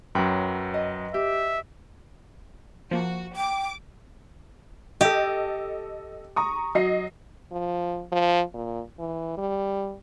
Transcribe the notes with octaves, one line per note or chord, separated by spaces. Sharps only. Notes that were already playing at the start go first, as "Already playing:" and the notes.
F#2 F#3 B4 G5 B5
D#5
G4 E5
F3 A#3 F#4
G5 D6
G4 A4 D#5
A#5 C#6 D#6
F#3 D#5 C7
F3
F3
A#2
E3
G3